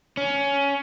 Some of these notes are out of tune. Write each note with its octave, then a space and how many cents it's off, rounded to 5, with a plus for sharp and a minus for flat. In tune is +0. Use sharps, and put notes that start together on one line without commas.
C#4 +15